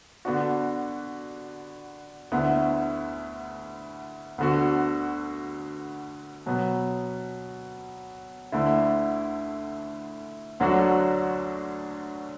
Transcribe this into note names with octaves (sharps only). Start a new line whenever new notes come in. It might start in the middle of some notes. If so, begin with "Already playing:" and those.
D3 B3 D4 F#4
D2 D3 B3 E4
D2 D3 B3 F#4
B2 F#3 B3
D2 D3 A3 E4
D2 D3 F#3 D4 F#4